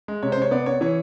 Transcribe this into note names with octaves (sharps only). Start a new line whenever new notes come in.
G#3
C3 C#5
C5
C3 C#5
B3 D5
B3 C#5
E3 C#5